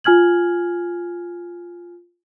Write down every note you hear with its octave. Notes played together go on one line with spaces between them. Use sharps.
F4 G#5 F6 G#6 F#7